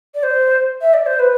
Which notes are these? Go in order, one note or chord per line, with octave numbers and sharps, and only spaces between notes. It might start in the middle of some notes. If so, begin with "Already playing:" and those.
D5
C5
E5
D5
C5
B4